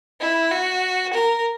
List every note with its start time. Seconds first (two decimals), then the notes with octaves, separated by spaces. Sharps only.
0.20 E4
0.51 F#4
1.13 A#4